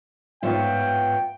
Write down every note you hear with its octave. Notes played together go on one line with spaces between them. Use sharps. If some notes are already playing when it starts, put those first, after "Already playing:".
G#2 B3 F4 C#5 E5 G5 C#6